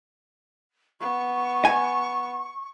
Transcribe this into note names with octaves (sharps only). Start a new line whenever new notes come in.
B3 C#6
G#5